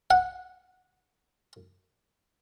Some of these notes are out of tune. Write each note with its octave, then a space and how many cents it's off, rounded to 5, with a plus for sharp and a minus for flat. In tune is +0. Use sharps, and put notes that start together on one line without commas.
F#5 -15